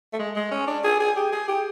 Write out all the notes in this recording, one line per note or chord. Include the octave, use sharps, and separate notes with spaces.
A3
G#3
G#3
C#4
D4
G#4
G#4
G4
G#4
G4